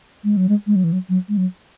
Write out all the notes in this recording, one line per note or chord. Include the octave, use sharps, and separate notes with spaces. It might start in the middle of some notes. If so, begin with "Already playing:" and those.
G#3
F#3
G#3
G#3
F#3
E3
F#3
F#3
G#3
F#3